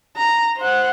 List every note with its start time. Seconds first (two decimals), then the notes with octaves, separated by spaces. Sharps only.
0.17 A#5
0.57 C5 F#5